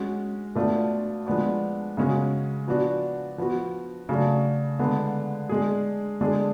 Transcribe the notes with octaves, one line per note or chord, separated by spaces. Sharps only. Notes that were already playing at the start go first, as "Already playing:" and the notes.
Already playing: G#3 C#4 F#4
B2 A3 D4 F4
F3 G#3 B3 D4
C#3 G#3 C#4 F#4
F3 B3 D4 F#4
F3 B3 F#4
C#3 F#3 A3 D4
D3 G#3 B3
G#3 D4 G#4
D3 G#3 D4 G#4